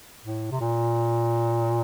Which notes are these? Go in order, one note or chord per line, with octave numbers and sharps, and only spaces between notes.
A2
C3
A#2